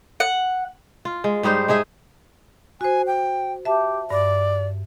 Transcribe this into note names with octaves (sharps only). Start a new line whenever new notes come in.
F#5
F4
G#3
G#2 G3 D#4 C5
G#3 D#4 G#4 E5
F#4 C5 G#5
G5
G4 E5 A5
G2 D5